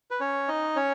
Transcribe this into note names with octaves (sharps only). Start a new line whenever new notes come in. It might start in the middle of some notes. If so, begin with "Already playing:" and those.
B4
C#4 C#5
D#4 D#5
C#4 C#5